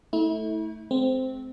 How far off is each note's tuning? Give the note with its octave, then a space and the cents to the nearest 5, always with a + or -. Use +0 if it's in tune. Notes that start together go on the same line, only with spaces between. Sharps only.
A3 +0 E4 -35
G#3 +45 C4 -10